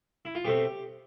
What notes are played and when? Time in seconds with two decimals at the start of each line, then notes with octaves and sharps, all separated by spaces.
0.25 E4
0.35 F4
0.45 B2 A3 C4 G4